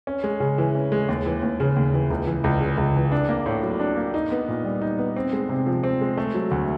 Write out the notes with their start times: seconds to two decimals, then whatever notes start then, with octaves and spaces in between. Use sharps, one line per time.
0.07 C#4
0.24 G#3
0.40 C#3
0.58 E3
0.75 C#4
0.92 G#3
1.09 D#2
1.26 E3
1.43 D#2
1.60 C#3
1.76 D#2
1.94 E3
2.10 C#2
2.27 E3
2.44 C#2
2.61 C#3
2.78 C#2
2.95 E3
3.12 D4
3.29 A#3
3.46 A2
3.63 F#3
3.79 D4
3.97 A#3
4.14 D#4
4.32 B3
4.48 A#2
4.64 G3
4.82 D#4
4.98 B3
5.16 C4
5.33 G#3
5.49 C3
5.66 F3
5.84 C4
6.01 G#3
6.17 A3
6.34 F#3
6.51 D2